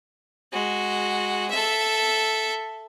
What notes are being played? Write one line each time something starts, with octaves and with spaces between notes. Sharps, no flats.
G#3 F#4
A4 E5